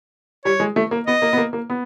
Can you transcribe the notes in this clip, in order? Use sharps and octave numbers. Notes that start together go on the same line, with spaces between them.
G3 C#5
G#3
A3
A#3
B3 D#5
A#3
B3
A#3
A#3
B3